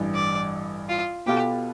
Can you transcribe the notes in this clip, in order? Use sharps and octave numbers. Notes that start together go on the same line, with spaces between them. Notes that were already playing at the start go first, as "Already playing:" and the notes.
Already playing: A1 G2 E3
D5
F4
B2 B3 F4 G4 A4